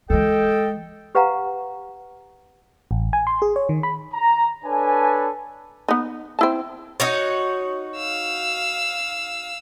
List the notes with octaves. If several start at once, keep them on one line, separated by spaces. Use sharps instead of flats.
E3 G#3 A4 D#5 G5
G4 B4 F5 F#5 A#5
A1
G#5
C6
G#4
C#5
D#3
B5
A#5
D4 A4 B4 C#5 G#5
B3 D#4
C4 E4 A5
D#4 F#4 C#5
F5 E6